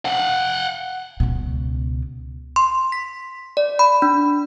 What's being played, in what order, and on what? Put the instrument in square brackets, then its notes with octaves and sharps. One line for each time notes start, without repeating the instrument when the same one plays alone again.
[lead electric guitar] F5 F#5
[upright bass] C#2 B2
[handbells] C6
B6
D5
B5
D4